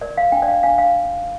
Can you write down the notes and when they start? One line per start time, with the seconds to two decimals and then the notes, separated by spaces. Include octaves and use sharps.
0.01 A#4 D5
0.17 F5
0.32 D4 G5
0.42 D5
0.48 F5
0.63 D4 F5
0.78 F5